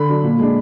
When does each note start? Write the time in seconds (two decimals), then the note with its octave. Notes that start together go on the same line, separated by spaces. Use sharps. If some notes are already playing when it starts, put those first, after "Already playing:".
Already playing: D3 B5
0.09 F#3 D4
0.24 A#2
0.39 G#3 D4